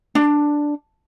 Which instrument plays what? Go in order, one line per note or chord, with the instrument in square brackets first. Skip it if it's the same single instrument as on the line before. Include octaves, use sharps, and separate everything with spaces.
[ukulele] D4